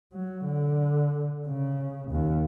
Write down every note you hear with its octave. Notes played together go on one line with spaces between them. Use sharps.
F#3
D3
C#3
D#2